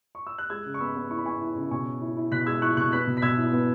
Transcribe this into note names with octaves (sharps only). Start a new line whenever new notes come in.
C#6
E6
F#6
G#3 E6 G#6
C#3
C#6
B3 B5 E6
B3
E4 C#6
B5
B3 G#5 C#6
E4
C#3
B2 G#5 C#6
C#4
E4
E4
B2 F#6 B6
G#3 E6 G#6
E4 C#6 F#6
B2 C#6 F#6
B3 F#6 B6
B2
B6
B2 E6 G#6
E4
B3